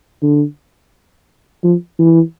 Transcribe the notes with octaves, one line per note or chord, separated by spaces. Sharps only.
D3
F3
E3